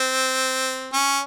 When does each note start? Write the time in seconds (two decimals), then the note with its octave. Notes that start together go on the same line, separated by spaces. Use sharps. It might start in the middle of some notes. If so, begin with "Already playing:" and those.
Already playing: C4
0.93 C#4